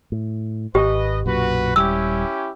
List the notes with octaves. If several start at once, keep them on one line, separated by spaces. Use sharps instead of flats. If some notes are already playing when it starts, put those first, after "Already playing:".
A2
G#1 G4 B4 D#5
B1 F#2 A#2 F#4 B4
D#1 G3 C#4 E4 G4 E6